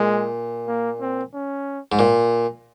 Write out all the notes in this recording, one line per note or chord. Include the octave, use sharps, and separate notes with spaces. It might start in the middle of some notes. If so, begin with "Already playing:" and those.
Already playing: A#2 G#3
A#3
C4
C#4
G#2
A#2